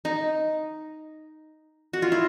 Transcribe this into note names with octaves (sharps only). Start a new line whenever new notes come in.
D#4
F#4
F4
E4